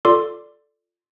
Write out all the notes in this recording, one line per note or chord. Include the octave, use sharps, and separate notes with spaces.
F4 A4 D5 C6 D6